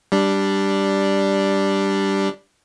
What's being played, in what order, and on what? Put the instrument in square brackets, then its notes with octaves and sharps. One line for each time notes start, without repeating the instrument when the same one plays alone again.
[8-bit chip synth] G3 D4